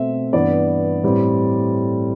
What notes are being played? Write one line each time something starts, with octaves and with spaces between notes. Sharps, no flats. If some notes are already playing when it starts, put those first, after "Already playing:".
Already playing: B2 A3 C4 E5
G2 E3 B3 D5
A2 G3 C4